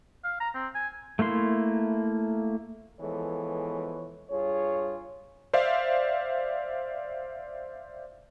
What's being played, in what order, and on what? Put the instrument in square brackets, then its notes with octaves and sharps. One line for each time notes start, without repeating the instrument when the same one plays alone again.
[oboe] F5
A#5
C4
G#5
[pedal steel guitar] A3 A#3 E4 C6
[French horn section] E3 F3 G#3 B3 A4 C#5
G2 F4 G#4 C#5
[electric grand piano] C5 D5 E5 F5